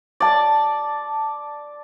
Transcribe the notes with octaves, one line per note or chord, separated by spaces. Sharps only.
D5 A5